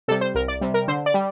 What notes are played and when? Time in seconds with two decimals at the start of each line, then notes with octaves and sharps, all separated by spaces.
0.08 C3 A4
0.11 G3
0.21 C5
0.34 C2 A#4
0.48 D5
0.61 C3 G3
0.74 A#4
0.88 D3 C5
1.06 D5
1.14 G3